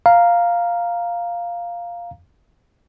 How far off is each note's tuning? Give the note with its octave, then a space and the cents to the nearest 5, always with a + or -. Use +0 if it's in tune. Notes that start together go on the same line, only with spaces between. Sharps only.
F5 +0 A#5 +0